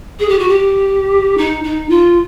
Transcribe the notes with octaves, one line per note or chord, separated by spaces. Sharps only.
G#4
G4
F#4
G4
D#4
D#4
F4